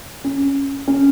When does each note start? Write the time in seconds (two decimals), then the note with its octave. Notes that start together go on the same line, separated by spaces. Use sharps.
0.24 C#4
0.88 C#4